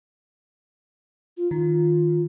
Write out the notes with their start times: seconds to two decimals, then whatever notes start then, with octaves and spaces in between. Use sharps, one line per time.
1.37 F4
1.51 D#3 F4